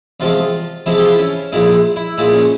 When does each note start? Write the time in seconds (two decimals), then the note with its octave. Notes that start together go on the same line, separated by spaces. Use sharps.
0.20 E2 C3 F3 G#3 F4
0.86 E2 C3 F3 G#3 E4
0.98 G4
1.05 F4
1.12 E4
1.19 C#4
1.52 A#1 A#2 G#3 E4
1.96 E4
2.18 A#1 A#2 G#3 E4
2.34 C#4